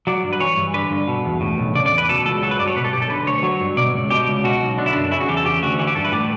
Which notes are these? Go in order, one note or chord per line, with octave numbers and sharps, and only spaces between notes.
F#3 D5
G2
B4
E3 C#5
G2
D3 B4
G2
B2
E2
A2
B1
C#3 D5
D5
E2
B4
B2 A4
C#2 A4
F#3 A4
B4
G2 D5
C#5
B2 B4
A4
B1 G4
A4
D3 B4
D2 C#5
F#3 C#5
G2
B2 D5
C#2
B2 G4
C#2
B2 F#4
B1
D3 D4
E4
F#2 D4
C#3 E4
F#4
E2 G4
A4
C#3 G4
D2 F#4
E3 F#4
G4
G2 A4
B4
A2 D5